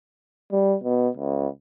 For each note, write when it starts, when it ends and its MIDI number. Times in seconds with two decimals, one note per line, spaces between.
0.52 0.76 55
0.84 1.08 47
1.17 1.48 37